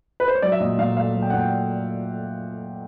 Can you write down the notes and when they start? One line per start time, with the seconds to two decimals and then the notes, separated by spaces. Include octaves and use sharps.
0.20 B4
0.28 C5
0.35 C#5
0.42 F#3 D5
0.52 E5
0.60 A#2 D#5
0.79 A#2 F5
0.97 A3 F5
1.15 F#3
1.22 G5
1.30 F#5
1.33 A#2 G5